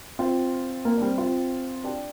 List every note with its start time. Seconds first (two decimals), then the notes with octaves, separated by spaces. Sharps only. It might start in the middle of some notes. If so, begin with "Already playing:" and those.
0.19 C4 F4
0.85 A#3
0.97 D4
1.02 G3 C4
1.18 C4 F4
1.84 D4 G4